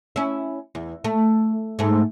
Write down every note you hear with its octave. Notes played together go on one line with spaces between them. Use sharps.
C#4 E4
E2
A3
G#2 A3